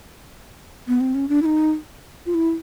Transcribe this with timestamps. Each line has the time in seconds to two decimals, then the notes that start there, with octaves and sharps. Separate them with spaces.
0.88 B3
1.01 C4
1.15 C#4
1.29 D4
1.42 E4
1.46 D#4
2.26 F4
2.34 E4